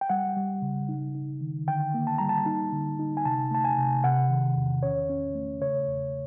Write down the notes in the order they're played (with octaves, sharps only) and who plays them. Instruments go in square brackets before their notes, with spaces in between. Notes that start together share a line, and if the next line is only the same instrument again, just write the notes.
[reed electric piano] G5
G3 F#5
G3
C#3
D#4
D#4
D#3
D3 G5
A#3
A5
G3 A#5
A5
D#4
D3
D#4
G#5
C3 A5
A3 A5
G#5
C3
C3 F#5
D#3
E2
C#4 C#5
C#4
A3
C#3 C#5
E2